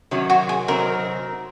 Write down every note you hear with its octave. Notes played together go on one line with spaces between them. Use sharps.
C3 D#3 F#3 C#4
F#4
G#4
C3 F#3 C4 D#4 A#4